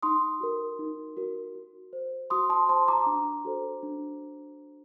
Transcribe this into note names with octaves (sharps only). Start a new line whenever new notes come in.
D#4 C6 D#6
F#4 A#4
D#4
F#4 A#4
F#4
C5
F#4 C6 D#6
A5 C6
C5 A5 C6
A#5 D6
D4
F#4 A4 C5
D4